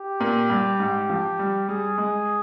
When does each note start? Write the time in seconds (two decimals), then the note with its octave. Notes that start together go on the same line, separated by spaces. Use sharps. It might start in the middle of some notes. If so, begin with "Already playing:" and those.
Already playing: G4
0.20 A#2
0.50 G2
0.79 G#2
1.10 F3
1.39 G3
1.68 G3 G#4
1.98 G#3